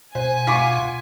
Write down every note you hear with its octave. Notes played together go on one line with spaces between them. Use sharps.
B2 C5 F#5 G#5
F4 C#6 D6 B6